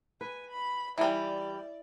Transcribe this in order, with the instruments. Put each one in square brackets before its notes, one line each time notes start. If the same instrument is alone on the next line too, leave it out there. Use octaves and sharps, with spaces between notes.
[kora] B4 [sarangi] G#5
[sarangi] B5
[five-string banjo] E3 G3 [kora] E4 [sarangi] D5